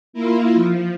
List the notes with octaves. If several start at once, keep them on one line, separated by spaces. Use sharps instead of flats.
A#3 E4 F4
F3